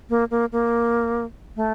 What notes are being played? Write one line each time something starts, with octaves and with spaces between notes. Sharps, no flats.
A#3
A#3
A#3
A3